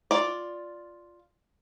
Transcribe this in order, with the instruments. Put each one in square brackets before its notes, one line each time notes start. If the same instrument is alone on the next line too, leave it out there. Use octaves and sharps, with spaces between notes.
[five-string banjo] F4 D5